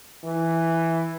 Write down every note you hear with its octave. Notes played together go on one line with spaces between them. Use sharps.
E3